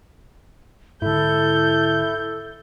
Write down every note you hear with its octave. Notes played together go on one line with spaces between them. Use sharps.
G#2 D3 E4 A4 G6